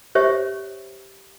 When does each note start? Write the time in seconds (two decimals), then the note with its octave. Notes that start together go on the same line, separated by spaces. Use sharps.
0.15 G4 C5 C#5 E5